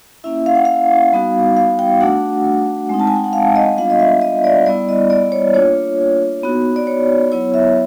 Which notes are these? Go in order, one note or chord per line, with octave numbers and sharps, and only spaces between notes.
A#3 C#4 E4 E5
F5
F#5
F5
G3 B3 D#4 F#4
F5
G5
A3 D4 F#4 F#5
G#3 C4 D#4
A5
G#5
G5
F#5
F5
D#5
G3 B3 D4 F4 F5
D#5
E5
D#5
D5
G3 B3 E4 D5
D#5
D5
C#5
A#3 D4 F4 C#5
B3 D#4 F#4
D5
C#5
F#3 B3 E4 C#5
E5